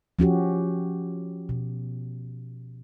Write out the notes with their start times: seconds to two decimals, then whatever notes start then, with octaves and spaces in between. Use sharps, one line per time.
0.19 F3 C#4 F#4 G4
1.49 B2